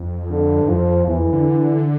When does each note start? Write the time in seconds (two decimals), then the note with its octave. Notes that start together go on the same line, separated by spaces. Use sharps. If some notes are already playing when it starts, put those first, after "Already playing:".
Already playing: F2
0.31 D3
0.59 G2
0.68 F2 F3
1.07 E2 E3
1.19 F2
1.33 D3